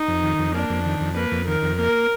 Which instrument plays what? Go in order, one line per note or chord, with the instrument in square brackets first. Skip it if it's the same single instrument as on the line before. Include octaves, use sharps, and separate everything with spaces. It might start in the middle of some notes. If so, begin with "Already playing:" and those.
Already playing: [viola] D#4
[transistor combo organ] F2
D#3
F2
[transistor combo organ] A#3 [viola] D4
[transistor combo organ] F2
D#3
F2
[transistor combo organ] A#3 [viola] B4
[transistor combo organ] F2
[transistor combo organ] D#3 [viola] A#4
[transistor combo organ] F2
[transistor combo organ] A#3 [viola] A#4